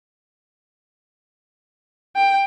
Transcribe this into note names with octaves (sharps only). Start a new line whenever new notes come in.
G5